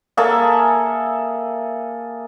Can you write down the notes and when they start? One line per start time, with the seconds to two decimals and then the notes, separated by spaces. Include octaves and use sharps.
0.17 A#3 G#4 A4 E5